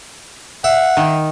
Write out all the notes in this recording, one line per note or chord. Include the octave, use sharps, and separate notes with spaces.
E5 F#5
D#3